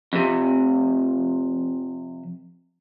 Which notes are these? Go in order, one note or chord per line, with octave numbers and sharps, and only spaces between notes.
F2 C3